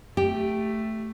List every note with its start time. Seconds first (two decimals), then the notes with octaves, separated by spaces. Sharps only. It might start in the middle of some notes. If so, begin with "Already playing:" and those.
0.17 A3 G4